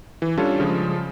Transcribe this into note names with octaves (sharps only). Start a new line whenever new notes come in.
E3
G3 C#4 D4 F4 A4 C#5
C#3 F3 G#3